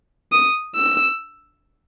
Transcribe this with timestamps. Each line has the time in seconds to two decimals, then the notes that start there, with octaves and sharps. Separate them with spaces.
0.32 D#6
0.76 E6